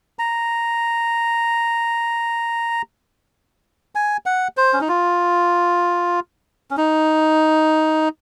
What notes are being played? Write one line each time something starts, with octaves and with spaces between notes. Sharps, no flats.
A#5
G#5
F#5
C5
C#4
D#4
F4
C#4
D#4